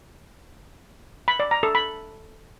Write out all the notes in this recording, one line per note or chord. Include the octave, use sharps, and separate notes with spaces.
B5
D5
A#5
A4
B5